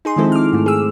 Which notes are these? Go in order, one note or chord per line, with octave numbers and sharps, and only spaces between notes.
D#4 G#4 C6
D#3 F3 G#3 C4 E4 A4
D6 F6
G#2 A3
G#4 E6